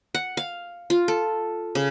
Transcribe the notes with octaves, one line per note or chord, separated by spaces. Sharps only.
F#5
F5
F4
A4
C#3